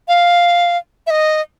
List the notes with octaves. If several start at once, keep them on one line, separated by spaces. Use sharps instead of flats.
F5
E5
D#5